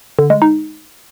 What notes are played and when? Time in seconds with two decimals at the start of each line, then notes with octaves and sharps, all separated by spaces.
0.19 D3
0.30 G#3
0.42 D#4